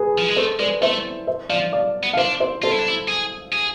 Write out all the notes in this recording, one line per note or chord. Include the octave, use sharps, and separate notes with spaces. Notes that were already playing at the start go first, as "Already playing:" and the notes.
Already playing: G#4 B4
F3
G#3
A3 A4 C5
G#3 B4 D5
A3 C5 E5
C5 E5
F3 D5 F5
D5 F5
B3
F5
D4 C5 E5
C5 E5
F4 A4 C5
E4
D4
E4
G#4
G#4